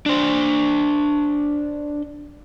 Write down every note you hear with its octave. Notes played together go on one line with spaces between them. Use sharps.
D4 C5